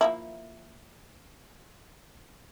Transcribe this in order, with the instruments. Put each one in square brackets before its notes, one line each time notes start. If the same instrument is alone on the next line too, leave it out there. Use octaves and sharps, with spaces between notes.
[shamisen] F3 A#3 E4